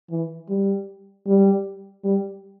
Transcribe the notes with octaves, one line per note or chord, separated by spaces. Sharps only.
E3
G3
G3
G3